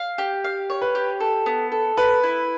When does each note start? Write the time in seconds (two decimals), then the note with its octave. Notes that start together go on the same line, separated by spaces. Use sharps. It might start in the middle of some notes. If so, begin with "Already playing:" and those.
Already playing: F5
0.18 G4
0.44 F5
0.70 C#5
0.82 B4
0.95 G4
1.20 A4
1.46 B3
1.72 A4
1.97 B3 B4
2.23 E4